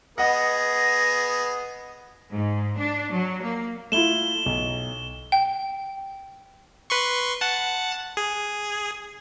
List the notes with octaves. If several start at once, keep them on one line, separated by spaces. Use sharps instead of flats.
B3 G#4 D#5 F#5 A#6
G#2
D4
F#3
A#3
A3 E4 F4 E7 G7
B1
G5
B4 C6 C#6
F#5 A5
G#4